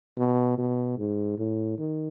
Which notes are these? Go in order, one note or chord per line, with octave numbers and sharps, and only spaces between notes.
B2
B2
G#2
A2
D#3